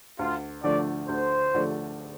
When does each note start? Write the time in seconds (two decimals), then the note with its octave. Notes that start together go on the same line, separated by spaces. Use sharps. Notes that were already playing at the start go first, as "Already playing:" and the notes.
0.19 D2 F4
0.63 D3 F3 A3 D4 D5
1.09 D2 C5
1.54 D3 F3 A3 D4